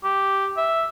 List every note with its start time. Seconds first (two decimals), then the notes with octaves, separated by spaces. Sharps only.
0.04 G4
0.57 E5